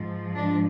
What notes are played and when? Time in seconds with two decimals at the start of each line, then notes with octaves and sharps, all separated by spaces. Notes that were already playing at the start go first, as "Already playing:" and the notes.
Already playing: G#2 F3
0.36 D4